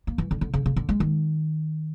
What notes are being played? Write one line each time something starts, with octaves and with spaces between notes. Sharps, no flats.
A#3
E3
D3
D3
C#3
C#3
D3
G#3
D#3